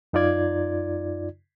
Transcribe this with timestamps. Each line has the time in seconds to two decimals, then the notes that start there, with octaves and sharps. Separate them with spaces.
0.13 F#2 D#4 F4 D5 G#6